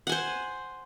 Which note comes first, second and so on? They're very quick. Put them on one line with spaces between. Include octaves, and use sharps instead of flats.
F#5 G#5 C5